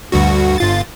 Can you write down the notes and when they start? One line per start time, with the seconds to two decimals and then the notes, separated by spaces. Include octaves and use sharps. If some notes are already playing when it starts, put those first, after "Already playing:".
0.12 D2 G2 F#4
0.58 G1 F4 A6